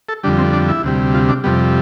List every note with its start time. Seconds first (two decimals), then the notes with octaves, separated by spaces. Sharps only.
0.09 A4
0.23 F2 D3 G3 D4
0.38 C4
0.53 D4
0.68 E4
0.83 D2 C3 G3
1.14 F4
1.29 D4
1.44 F2 C3 G3 B3